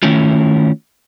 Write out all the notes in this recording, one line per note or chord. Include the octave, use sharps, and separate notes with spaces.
D#3 A3 C#4 E4 F4